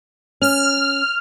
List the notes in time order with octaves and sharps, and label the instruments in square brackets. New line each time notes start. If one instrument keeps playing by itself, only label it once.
[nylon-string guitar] C#4 [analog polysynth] F6